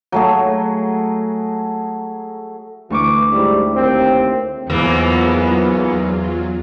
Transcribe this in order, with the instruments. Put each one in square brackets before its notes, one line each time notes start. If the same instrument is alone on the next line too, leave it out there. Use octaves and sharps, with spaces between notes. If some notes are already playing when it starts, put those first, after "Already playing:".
[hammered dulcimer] F#3 A3 G#4
[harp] D2 C#6 D6 [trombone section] E3
[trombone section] G#2 G3 [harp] E4
[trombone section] D#2 C4
[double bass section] E2 [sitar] G#2 E3 A#3 [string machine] F#3 F4 [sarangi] B3